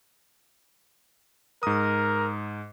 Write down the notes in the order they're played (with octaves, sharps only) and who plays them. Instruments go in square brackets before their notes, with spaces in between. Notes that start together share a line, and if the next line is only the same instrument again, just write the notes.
[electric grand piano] G#2 D#6 [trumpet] A#4